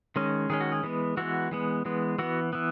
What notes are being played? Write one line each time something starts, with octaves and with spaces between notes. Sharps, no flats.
D#3 G#3 C#4
D#3 G#3 C#4 G#4
F#4
G#4
E3 G#3 B3
E3 G#3 B3 F#4
E3 G#3 B3
E3 G#3 B3
E3 B3 F#4
E3 B3